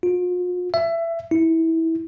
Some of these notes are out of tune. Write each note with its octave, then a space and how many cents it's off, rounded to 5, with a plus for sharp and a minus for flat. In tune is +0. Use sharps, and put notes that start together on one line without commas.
F4 +45
E5 +20
E4 -20